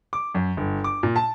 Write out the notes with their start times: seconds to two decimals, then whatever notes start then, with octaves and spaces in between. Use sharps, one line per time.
0.13 D6
0.35 F#2
0.57 G1
0.84 D6
1.03 A#2
1.16 A5